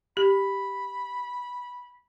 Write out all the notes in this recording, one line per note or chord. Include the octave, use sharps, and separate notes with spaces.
G4 B5